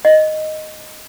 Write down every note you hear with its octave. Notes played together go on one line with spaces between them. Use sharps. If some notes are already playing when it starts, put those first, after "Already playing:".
D#5